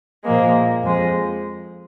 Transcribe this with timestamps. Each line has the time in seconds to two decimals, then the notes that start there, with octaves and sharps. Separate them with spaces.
0.25 A#2 F3 G#3 A#3
0.83 F2 F3 G#3